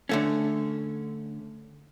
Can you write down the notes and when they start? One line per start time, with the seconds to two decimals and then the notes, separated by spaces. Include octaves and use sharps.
0.09 D3 A3 C#4